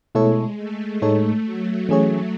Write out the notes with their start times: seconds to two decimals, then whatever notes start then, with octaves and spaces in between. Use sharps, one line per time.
0.14 B2 G#3 A3 E4 A4 C#5
0.57 A3
1.02 A2 G#3 A3 D#4 A4 C#5
1.45 F#3
1.89 E3 A3 C#4 G#4 C#5